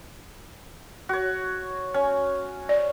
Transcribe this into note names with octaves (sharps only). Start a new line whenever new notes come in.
F#4 C#5
C#4
D5